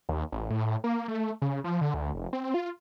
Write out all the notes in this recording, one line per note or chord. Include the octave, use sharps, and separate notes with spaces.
D#2
A1
A2
A#3
A3
C#3
F3
D3
D2
F1
C4
F4